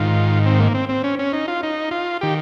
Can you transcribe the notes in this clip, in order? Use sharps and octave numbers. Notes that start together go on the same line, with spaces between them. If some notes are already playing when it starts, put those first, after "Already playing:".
Already playing: G#2 D#3 F4
C4
A#3
C4
C4
C#4
C#4
D#4
F4
D#4
F4
D#3 G4